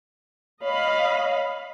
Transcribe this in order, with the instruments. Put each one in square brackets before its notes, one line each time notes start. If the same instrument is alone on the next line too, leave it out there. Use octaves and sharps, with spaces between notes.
[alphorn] C#5 [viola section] D#5 F5 B5